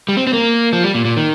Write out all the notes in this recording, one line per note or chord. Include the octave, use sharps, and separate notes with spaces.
G3
C4
C4
A#3
F3
G3
A#2
A#2
D#3